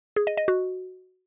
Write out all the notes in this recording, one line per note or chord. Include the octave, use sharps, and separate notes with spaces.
G#4
D#5
D#5
F#4